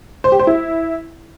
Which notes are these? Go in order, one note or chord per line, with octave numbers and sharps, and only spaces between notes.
C5
G4
C5
E4